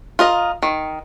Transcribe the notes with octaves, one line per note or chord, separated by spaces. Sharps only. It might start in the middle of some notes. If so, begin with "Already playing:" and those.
F4 A#4 D#5
D#3